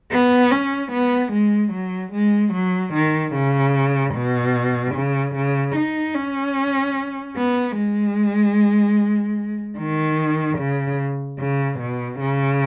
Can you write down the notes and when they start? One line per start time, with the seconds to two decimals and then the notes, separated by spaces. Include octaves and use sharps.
0.12 B3
0.52 C#4
0.92 B3
1.33 G#3
1.73 F#3
2.13 G#3
2.54 F#3
2.94 D#3
3.34 C#3
4.15 B2
4.95 C#3
5.36 C#3
5.76 D#4
6.15 C#4
7.37 B3
7.77 G#3
9.78 D#3
10.59 C#3
11.40 C#3
11.80 B2
12.20 C#3